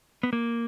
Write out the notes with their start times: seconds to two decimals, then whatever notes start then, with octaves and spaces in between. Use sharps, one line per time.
0.23 B3
0.33 A#3